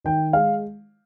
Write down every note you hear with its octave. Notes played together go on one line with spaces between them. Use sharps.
D#3 G5
G#3 F5